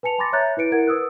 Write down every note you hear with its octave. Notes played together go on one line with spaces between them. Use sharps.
B4 G#5 A5 C#7 F7
G#5 B5 C6 D6 A6 A#6
C#5 E5 A#5 F#6 G6 A6
E4 B4 C#7 D7
E4 A#4 F#5 G#6 D7
B4 D#6 E6 F#6